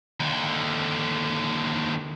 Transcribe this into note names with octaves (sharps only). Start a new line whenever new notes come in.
D#2 D3